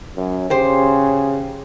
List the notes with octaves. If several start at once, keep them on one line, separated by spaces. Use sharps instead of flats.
F#2
C#3 G4 C5